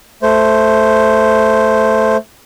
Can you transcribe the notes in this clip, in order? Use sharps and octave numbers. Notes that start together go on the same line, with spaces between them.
A3 C5